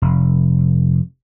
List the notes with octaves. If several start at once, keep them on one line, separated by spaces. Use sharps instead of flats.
F1